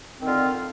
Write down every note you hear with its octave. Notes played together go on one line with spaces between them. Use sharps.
D3 D#3 C4 F4